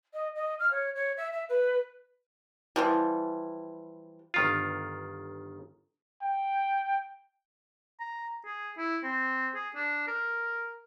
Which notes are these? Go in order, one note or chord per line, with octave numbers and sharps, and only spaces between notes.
D#5
D#5
F6
C#5
C#5
E5
E5
B4
E3 F3 G3
G1 D#3 F4
G5
A#5
G#4
E4
C4
G#4
D4
A#4